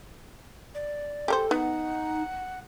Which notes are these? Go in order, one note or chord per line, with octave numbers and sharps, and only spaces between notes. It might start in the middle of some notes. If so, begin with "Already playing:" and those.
D5
G4 A4 A#4 C5
B3 D#4 F#5